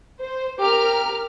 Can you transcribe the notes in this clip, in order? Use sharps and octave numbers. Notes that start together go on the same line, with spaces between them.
C5
G4 A#4 F6